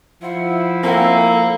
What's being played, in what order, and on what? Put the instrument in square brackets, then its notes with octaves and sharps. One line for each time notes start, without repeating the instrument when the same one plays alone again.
[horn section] F3 E4 [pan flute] F#5
[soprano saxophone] A#3 [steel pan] C4 F#5 [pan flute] A4